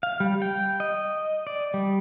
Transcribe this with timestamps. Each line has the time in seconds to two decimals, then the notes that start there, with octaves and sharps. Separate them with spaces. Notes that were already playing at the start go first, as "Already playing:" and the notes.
0.03 F5
0.20 G3
0.42 G5
0.80 D#5
1.47 D5
1.74 G3